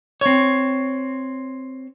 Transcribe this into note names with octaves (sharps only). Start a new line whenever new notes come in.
C4 C#5